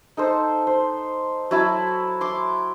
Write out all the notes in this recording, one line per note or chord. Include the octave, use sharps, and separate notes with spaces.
D#4 A4 C5
C5
F#3 E4 A5
C6 D6